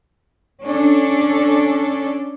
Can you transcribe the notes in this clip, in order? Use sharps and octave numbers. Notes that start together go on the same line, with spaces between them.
C#4 D4 A4